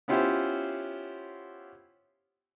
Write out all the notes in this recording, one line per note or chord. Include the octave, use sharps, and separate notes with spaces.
B3 C#4 E4 F4 G4 C5